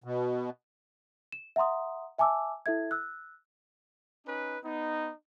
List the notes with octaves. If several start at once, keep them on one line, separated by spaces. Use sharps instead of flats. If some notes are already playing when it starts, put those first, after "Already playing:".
B2
E7
E5 F#5 A#5 C6 D#6
E5 G#5 A5 D6 E6
E4 A4 E5 G#6
E6 F#6
C#4 D#4 B4
B3 D#4